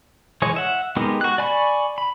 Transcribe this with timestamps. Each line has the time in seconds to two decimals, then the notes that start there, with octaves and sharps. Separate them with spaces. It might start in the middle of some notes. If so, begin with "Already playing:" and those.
0.42 E3 G#3 G#4 C#5
0.56 E5 F#5
0.96 G#3 B3 D#4 G4 A#4
1.21 F#4 F#6
1.38 D5 G#5 B5 C#6
1.98 B5